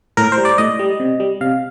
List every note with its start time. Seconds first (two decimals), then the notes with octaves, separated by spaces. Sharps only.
0.17 A2 A#4
0.32 C5
0.38 G3
0.45 D5
0.58 A2 D#5
0.79 G3
1.00 C3
1.20 G3
1.41 C3 F5